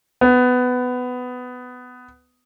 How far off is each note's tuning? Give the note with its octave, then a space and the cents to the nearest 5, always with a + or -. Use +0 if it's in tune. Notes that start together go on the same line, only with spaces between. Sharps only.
B3 +15